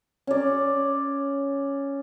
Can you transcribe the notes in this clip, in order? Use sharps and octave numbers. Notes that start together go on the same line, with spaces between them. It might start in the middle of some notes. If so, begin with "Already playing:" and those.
C#4 D5